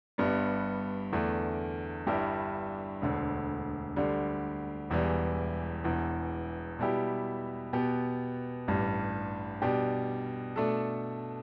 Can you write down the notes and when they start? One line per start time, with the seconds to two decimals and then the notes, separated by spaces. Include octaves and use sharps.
0.18 G1 G2 G3 B3
1.12 E2 D3 A3 D4
2.07 G1 G2 G3 E4 G4
3.02 E1 D2 D3
3.96 D2 D3 G3
4.90 E1 E2 E3 G3
5.84 E1 E2 E3
6.79 B2 G3 E4 G4
7.73 B2 B3 G4
8.68 A1 G2 G3
9.62 B2 G3 D4 G4
10.56 B2 A3 D4 A4